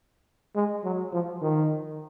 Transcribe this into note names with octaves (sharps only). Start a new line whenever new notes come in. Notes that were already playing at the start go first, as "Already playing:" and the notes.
G#3
F#3
F3
D#3